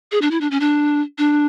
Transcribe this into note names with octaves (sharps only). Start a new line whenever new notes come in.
G#4
D4
E4
D4
C#4
D4
D4